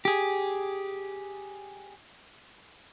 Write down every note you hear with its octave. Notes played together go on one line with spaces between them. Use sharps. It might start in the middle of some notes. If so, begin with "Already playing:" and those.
G4 G#4